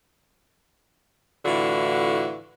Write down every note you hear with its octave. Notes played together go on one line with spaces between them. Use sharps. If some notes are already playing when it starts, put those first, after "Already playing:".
A2 D3 E3 F4 F#4